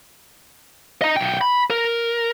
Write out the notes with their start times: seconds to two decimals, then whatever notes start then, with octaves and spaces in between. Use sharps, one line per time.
1.02 D#5 A#5
1.16 B1 G5
1.41 B5
1.70 A#4